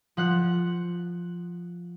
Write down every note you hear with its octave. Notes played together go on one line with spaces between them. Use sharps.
F3 F#5 F#6